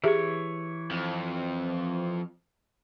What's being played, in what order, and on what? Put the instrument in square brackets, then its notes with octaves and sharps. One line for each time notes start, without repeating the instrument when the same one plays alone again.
[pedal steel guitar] E3 C#5 [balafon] G4 G#4 E5
[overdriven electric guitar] F2